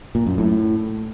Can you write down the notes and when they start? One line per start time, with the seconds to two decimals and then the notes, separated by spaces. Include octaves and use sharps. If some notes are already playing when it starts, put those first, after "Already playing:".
0.15 A#2
0.26 F#2
0.38 A2